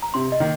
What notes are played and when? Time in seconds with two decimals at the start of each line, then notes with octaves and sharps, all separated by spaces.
0.02 A#5
0.14 C3 C6
0.32 D#5
0.40 D#3 A#3